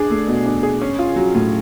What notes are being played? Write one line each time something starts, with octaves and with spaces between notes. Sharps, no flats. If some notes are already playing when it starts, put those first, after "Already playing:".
Already playing: D4 G#4
A3
B2
D4
G#4
C#4
F4
F#3
A2